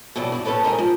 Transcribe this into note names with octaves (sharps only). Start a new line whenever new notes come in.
B2 E3 F#3 G3 D4
G2 E3 E4
C4 C#4 A4 B4 C#5 A5
G#3 C4 D#4 G#4 A#4 D#5
F3